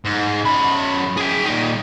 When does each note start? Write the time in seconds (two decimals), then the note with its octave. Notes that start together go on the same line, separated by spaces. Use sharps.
0.05 G#2
0.45 F#2 B5
1.17 G#4 G5
1.46 A#2 D#4